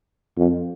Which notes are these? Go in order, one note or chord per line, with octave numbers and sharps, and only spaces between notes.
F2